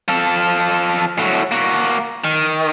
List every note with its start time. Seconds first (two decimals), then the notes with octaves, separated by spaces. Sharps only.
0.08 F3 A4
1.19 A2 F#3
1.52 A#3 F#4
2.24 D#3